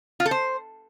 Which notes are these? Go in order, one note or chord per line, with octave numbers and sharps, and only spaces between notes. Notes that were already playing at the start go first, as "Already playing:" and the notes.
F4
A4
C5